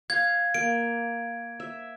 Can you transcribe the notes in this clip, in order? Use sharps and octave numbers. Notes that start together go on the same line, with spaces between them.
F5 G#6
A#3 D7
E5